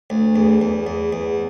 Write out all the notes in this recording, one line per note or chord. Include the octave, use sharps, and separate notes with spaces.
D2
E2
E2
E2
E2